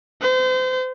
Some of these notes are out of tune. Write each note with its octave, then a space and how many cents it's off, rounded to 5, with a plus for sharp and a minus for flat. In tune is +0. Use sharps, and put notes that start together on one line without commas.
C5 -35